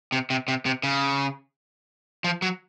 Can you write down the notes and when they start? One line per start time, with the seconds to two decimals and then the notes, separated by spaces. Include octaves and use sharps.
0.12 C3
0.30 C3
0.48 C3
0.65 C3
0.83 C#3
2.24 F3
2.42 F#3